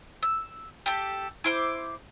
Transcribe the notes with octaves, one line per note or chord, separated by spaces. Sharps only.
E6
G4 A4
E4 C5 D6